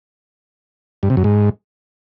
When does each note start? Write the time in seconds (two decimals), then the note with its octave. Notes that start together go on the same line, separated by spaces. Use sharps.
1.03 G2
1.10 C3
1.17 F#2
1.24 G#2